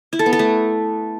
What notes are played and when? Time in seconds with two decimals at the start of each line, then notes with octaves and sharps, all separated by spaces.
0.13 E4
0.19 A4
0.26 B3
0.33 A4
0.39 A3